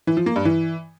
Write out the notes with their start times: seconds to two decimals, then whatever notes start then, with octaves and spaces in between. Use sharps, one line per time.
0.07 E3
0.17 F3
0.26 A#3
0.36 G2
0.45 E3